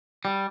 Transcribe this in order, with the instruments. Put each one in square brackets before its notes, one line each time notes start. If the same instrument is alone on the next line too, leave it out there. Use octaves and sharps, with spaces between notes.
[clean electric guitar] G3